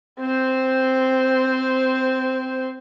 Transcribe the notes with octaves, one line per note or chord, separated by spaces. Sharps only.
C4 C5